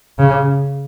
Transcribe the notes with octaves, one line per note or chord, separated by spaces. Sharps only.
C#3